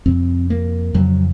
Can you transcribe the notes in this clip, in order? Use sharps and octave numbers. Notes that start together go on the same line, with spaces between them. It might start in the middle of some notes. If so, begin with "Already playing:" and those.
F2 C3 C4
A#3
F2 C#3 F#3